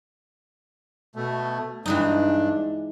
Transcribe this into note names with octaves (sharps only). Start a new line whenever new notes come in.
B2 A3
G2 E3 G#3 D4 D#4